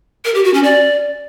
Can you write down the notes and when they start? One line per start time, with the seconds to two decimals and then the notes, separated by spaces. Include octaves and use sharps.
0.25 A#4
0.34 G4
0.44 F#4
0.54 C#4
0.64 D5